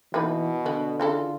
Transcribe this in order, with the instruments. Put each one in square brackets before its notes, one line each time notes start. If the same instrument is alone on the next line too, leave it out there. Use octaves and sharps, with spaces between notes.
[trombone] B2 [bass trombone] E3 [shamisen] A#3 D#4 B4
[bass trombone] D3 [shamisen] B3
[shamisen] C#3 E3 A4 [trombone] F4